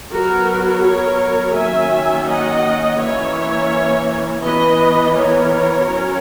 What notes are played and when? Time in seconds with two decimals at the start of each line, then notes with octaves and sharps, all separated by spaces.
0.12 F#3 B3 F#4 A#4
0.83 A#4 C#5
1.55 D#3 F#3 A#3 C#4 E5 G#5
2.27 D#5 F#5
2.98 E3 A#3 C#4 C#5 E5
4.42 E3 B3 B4 D#5
5.14 A#4 C#5
5.85 F#3 C#4